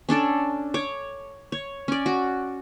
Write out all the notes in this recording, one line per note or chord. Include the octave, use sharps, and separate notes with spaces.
C#4 D4 A4 D5
C#5 D6
C#5
C#4 D5
F#4